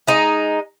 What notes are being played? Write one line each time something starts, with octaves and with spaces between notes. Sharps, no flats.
G#3 D#4